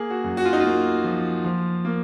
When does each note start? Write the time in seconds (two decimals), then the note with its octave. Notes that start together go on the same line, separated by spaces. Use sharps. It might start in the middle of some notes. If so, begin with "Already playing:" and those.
Already playing: A#3 G#4
0.10 F#4
0.24 F#2
0.37 F#4
0.45 F4
0.53 D#4
0.60 A#3 F4
1.04 F3
1.44 F3
1.85 A#3